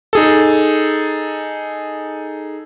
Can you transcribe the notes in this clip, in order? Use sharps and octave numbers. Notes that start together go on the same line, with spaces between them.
D#4 G#4 A4